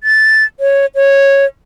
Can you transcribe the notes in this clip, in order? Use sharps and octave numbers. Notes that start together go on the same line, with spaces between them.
A6
C#5
C#5